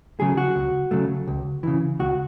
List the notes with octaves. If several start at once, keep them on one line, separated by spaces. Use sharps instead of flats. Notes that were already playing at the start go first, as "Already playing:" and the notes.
C#3 F#3 A3 G#4
F#4
C#2
C#3 F#3 A3
C#2
C#3 E3
C#2 F#4